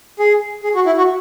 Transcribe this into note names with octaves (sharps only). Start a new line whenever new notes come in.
G#4
G#4
F#4
E4
F#4